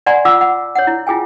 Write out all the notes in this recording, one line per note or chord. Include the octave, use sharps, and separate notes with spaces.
D5 F#5 G#5 A#5 C6
F4 F#5 D6 E6
F#5
C#5 F#5
E4
E4 F4 G#4 G5 G#5